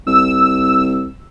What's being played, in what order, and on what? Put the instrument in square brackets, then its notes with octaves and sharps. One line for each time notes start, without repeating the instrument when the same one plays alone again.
[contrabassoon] C2 [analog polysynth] E6